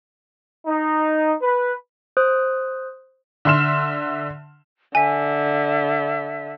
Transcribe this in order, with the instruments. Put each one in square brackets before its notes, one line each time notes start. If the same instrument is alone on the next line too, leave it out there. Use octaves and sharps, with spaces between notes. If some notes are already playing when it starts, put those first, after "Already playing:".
[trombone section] D#4
B4
[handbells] C5 D#6 F#6
[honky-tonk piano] D3 E5 C6 F6 E7
[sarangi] D3 [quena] E5 [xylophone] G#5 B6